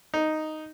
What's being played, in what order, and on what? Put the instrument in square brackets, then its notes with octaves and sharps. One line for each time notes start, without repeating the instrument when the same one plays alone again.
[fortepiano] D#4